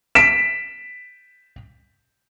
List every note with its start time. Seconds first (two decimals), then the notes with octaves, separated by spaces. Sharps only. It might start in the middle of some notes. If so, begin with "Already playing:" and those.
0.15 B6 D7 E7